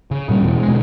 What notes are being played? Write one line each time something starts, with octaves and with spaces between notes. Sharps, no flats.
C#3
A#2 G3 C#4
E2 B2
G#3
B2 D3 G#3